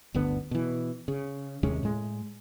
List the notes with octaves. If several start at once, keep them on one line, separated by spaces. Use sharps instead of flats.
G1 D2 D3 B3
B2 E3
C#3
D#2 C3 G#3 C#4
A2 G#3